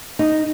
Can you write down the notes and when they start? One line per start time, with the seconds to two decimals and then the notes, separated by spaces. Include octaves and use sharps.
0.19 D#4